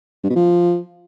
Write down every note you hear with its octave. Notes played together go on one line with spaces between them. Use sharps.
G2
B2
F3